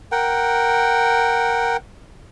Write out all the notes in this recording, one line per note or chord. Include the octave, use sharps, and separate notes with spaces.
A#4 F#5 G5